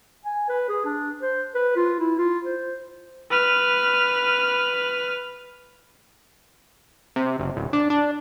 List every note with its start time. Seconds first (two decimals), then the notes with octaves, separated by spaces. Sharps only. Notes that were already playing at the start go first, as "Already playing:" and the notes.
0.25 G#5
0.49 B4
0.69 G#4
0.85 D4
1.22 C5
1.55 B4
1.76 F4
2.00 E4
2.19 F4
2.45 C5
3.31 B4 F6
7.16 C3
7.39 F#1
7.57 D1
7.73 D4
7.90 D4